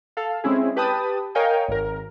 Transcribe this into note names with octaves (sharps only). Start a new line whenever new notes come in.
A4 F5
G#3 C4 C#4 E4 G#4
G4 B4 G5 A5 B5 D#6
A#4 C#5 D#5 F5 G5 G#5
G#1 A#4